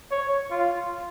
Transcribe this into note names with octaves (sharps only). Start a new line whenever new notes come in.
C#5
F4